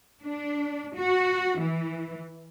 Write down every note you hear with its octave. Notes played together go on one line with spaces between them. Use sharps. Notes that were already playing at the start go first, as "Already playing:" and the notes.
D4
F#4
E3